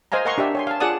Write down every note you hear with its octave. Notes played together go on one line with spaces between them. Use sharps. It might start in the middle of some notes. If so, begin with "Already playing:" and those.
C5 D#5 F5 G#5 A#5
A#4 D#5 F#5 A#5 C6 C#6
D4 G4 D5 E5
C#5 G#5 C6
F5 A5
F4 G#4 D5 F#5 A5 D#6